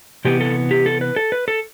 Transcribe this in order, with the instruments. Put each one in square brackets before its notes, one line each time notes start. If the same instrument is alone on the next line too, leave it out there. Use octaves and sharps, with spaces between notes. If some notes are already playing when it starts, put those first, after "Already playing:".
[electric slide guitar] C3 E3 B3 G4
A4
G4
A4
B4
A4
B4
A4